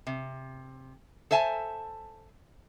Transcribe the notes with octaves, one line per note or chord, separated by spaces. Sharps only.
C3
A4 C5 E5 G#5 A5